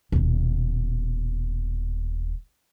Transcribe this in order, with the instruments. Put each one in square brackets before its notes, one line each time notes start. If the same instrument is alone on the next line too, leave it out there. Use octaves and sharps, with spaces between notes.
[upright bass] D#1 B2